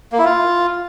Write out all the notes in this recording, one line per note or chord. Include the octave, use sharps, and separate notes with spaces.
A#3
E4
F4